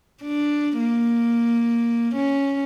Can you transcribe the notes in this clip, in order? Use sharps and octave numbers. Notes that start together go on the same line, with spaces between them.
D4
A#3
C#4